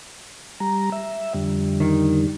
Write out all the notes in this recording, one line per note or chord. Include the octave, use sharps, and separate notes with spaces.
G3 A#5
E5
F2 D3 G3
D#3